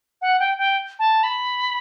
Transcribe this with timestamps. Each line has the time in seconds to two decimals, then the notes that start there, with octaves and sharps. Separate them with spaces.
0.22 F#5
0.39 G5
0.58 G5
0.99 A5
1.23 B5